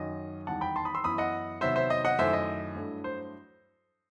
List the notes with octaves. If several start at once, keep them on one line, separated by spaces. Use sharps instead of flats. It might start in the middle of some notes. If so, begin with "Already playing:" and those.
Already playing: F#2 D#3 F#3 D#5
E2 D#3 G3 F#5 A5
G5 B5
A5 C6
B5 D#6
C6 E6
F#2 E3 B3 E4 B5 D#6
D#5 F#5
C3 D#3 F#3 B3 C5 E5
C5 E5
D#5
D#5 F#5
F#2 D#3 A3 E4 C5 E5
D#5
G2 F#3 A3 E4
C5